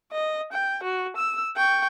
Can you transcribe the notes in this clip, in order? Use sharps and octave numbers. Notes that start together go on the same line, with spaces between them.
D#5
G5
F#4
E6
G5 C#6